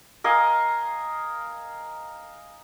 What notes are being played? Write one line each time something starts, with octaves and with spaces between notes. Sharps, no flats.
A#4 D#5 F5 G#5